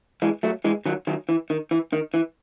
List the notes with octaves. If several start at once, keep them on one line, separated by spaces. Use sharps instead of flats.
E3 G#3
F#3 A3
E3 G#3
D#3 F#3
D#3 F#3
E3
D#3
E3
D#3
E3